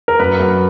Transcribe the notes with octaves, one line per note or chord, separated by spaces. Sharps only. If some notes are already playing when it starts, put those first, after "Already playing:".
A#4
F#2 B4
F#2